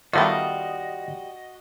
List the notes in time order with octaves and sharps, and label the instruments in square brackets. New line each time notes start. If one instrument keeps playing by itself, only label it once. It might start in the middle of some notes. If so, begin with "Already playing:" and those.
[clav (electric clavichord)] D#3 A3 B3 [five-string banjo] G3 F4 [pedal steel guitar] F#4 D#5